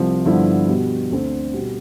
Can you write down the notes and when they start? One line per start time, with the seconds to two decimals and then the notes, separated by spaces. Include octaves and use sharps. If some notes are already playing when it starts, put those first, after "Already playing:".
Already playing: C2 C3 F3
0.25 G2 D3 F3 B3 E4
0.68 B2 G3 B3
1.11 D2 D3 A3 C4
1.54 B2 G3 B3